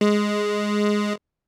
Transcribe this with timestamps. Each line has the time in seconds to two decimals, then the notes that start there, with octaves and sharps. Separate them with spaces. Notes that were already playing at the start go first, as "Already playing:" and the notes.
0.01 G#3